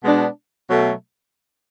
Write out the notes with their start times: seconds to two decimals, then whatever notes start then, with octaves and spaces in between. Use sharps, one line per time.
0.04 B2 G#3 B3 D4
0.70 B2 F#3 A3